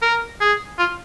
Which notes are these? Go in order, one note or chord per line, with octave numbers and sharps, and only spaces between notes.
A#4
G#4
F4